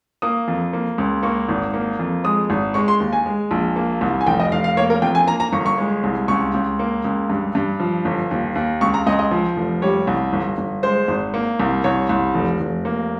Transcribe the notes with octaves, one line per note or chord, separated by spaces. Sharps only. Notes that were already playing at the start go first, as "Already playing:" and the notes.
A#3 D#6
F2
A#3
C#2
A#3 C#6
G#1
A#3
F2
G#3 D#6
G#1
G#3 C#6
C6
D#2
G#5
G#3
A#1
A#3
C2
G#5
F1 G5
D#5
F1 F5
F5
A#3 C#5
A#4
F2 G5
G#5
A#3 A#5
A#5
G1 C#6
C#6
G#3
C2
C#2 C#6
C#2
A#3
C#2
G2
G2
F3
G1
D#2
D#2
C#2 C#6
A#5
C#2 D#5
D#5
F3
F1
G3 C#5
C2
G1
G1
G#3 C5
G#1
A#3
C2
C2 C#5
C2
F1
F1
A#3